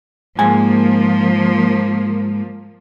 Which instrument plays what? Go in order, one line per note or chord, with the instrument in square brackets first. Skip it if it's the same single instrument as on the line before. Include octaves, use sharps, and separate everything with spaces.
[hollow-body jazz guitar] G#2 G#5 [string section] F3 A#3